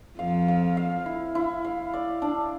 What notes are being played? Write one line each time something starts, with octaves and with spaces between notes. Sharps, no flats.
F2 F3 F5
F5
F5
E4
E4
F5
D5
D4